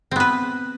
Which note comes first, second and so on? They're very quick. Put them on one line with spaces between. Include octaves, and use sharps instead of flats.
C4 B3 B4